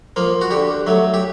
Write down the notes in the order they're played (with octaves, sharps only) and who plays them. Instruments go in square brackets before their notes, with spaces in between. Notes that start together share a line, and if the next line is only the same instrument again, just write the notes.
[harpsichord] F3 A#3
F#4
D3 G4
F#3 A3
G4